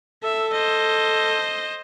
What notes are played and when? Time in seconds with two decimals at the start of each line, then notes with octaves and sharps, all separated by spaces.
0.23 A4 E5
0.53 C5 D#5